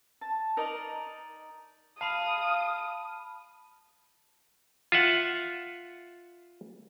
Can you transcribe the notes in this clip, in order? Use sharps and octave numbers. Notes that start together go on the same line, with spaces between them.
A5
D#4 A#4 D5 D#5
F5 A5 B5 D#6
F4 E5 F#5